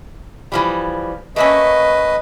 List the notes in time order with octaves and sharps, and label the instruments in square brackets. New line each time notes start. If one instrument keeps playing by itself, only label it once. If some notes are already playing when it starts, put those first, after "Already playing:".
[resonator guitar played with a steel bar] E3 F3 G3
[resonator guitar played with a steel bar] A3 A#3 C#4 [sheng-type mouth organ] B4 D#5